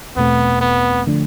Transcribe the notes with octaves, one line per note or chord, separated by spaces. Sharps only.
E2 B2 A3 B3 C4
B3
D3 F3 A3 D4